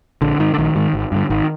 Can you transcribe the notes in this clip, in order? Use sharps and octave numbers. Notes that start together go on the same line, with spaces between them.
A#1 D3
G#2 D#3
D3
A#1 D#3
G#2 D#3
G#1
G2 D3
G#1 D#3